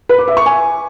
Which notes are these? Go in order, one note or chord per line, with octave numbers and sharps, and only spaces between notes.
B4
D6
E5
C#6
G#5